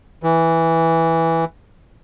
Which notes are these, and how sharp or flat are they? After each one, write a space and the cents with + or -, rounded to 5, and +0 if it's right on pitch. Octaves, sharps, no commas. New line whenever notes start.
E3 -5